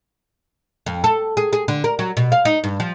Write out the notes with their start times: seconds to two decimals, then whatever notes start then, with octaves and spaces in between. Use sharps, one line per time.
0.86 F2
1.04 A4
1.37 G#4
1.53 G#4
1.68 D3
1.84 A#4
1.99 F#3
2.17 B2
2.32 F5
2.45 D#4
2.64 G2
2.80 F3